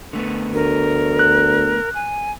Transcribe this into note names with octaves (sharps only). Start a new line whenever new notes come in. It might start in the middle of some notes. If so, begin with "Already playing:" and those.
D3 A3 B3
D2 A#4
F#6
G#5